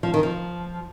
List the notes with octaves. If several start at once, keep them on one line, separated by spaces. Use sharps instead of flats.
F3
D#3
F3